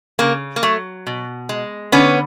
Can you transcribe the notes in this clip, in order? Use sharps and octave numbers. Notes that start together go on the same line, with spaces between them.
C#3 A#3
A#3
F#3 A3
B2
G#3
D3 B3 C#4